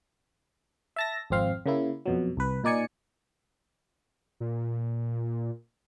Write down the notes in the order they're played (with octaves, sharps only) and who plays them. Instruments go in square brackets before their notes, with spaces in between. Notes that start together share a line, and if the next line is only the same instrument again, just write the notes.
[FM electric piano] E5 A5 A#6
G#1 F2 C4 F5
C#3 A#3 E4
F2 B2 F#3
C2 B4
A#2 D#4 D5 G#5 C#7
[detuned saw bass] A#2